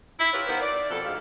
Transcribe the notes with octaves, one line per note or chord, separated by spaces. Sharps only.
E4
E4 F4 G4 A#4 B4 C#5
E3 B3 D#4 F4 A#4 C5
D5
F2 B2 A4
D2 G#2 F5